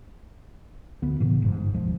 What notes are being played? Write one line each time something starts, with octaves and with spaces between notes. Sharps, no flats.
D2 B3
A2 C#3 E3 B3
G1 G#2
E1 D#2 F3 G#3